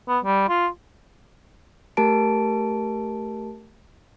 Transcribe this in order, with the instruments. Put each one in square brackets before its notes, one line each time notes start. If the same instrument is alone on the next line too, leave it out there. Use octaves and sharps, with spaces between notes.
[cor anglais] B3
G3
F4
[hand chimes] A3 G4 A#4 A5 D7